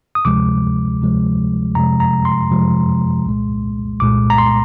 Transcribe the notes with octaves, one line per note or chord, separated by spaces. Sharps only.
D#6
D2 C3 F3 G#3 D6
D2 C3 F3 G#3
F2 C3 F3 G#3 A#5
A#5
C6
F2 C3 F3 G#3
C2 A#2 G#3
C2 A#2 G#3 D6
A#5
C6